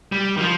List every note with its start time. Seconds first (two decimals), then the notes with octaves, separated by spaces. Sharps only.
0.12 G3
0.37 D#3
0.41 F3